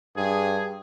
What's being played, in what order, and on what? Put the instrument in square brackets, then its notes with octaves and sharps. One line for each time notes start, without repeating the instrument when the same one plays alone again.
[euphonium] G2 [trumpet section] G#4